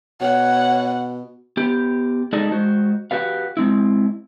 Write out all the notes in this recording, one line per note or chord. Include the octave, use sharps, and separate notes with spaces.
B2 C#5 F#5
B3 G4
G#3 D#4 G#4 A4 D5 D#5
G#3 F#4 C5
F#4 G4 B4 F5
G#3 C4 E4